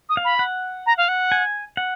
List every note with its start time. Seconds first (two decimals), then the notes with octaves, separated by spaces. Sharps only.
0.09 D#6
0.17 F5
0.25 B5
0.39 F#5
0.86 A#5
0.98 F5
1.08 F#5
1.32 G#5
1.77 F#5